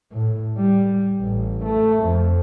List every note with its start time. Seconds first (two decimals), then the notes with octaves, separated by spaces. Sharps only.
0.12 A2
0.58 G3
1.20 A1
1.65 A3
2.04 F2